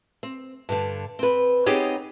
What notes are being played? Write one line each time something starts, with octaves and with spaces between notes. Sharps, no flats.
C4
G2 D3
C4 B4
B3 C4 D#4 G4 G#4 C#5